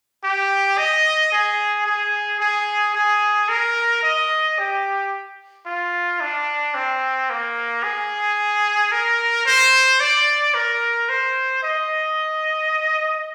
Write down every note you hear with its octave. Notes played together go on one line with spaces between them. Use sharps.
G4
D#5
G#4
G#4
G#4
G#4
A#4
D#5
G4
F4
D4
C4
A#3
G#4
A#4
C5
D5
A#4
C5
D#5